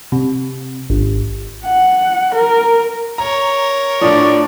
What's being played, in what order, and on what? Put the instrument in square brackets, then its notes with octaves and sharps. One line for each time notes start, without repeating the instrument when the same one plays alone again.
[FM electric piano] C3
G#1
[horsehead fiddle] F#5
A#4
[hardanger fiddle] A#4 C#5 [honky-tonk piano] A#5
[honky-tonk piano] A2 F3 [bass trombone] D4 [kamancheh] D5